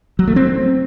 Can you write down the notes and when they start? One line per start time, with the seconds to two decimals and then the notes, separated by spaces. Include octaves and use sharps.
0.19 F#3
0.28 A3
0.36 C4